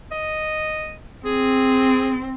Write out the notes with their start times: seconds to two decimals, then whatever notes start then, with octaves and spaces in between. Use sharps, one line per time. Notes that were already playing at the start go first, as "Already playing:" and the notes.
0.12 D#5
1.26 C4 G#4